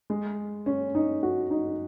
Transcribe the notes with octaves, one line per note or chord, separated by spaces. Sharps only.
G#3
C#4
D#4
F#4
D#4